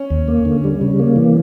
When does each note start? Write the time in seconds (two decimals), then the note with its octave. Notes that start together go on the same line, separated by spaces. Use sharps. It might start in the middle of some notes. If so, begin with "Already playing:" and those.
Already playing: C#4
0.10 D#2
0.28 A#3
0.45 D3
0.64 G3
0.81 C#3
0.99 A#3
1.16 E3